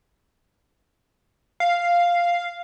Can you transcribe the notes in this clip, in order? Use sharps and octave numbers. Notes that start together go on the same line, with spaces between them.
F5